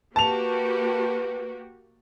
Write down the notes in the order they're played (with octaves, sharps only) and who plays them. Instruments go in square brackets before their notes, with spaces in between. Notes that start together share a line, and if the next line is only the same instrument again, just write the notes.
[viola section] A#3 F#4 G4 [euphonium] B4 [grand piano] A5 F7